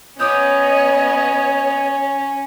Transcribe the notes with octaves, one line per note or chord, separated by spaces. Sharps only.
B3 C#4 C#5 D#5 D6 D#6 G6